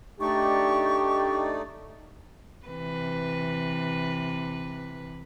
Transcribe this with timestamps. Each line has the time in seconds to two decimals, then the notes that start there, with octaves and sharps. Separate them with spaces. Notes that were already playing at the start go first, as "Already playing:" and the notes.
0.20 A3 D4 D#4 G4 D5 C#6
2.67 C3 E3 B4